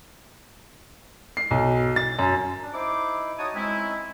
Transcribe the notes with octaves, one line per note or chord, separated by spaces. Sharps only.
C7
B1
A6
F#2
D4
D#4 E4 C5 D6
D#4 F#4 C#5 A5 D#6
G#3 C4 C#4 D#4 E4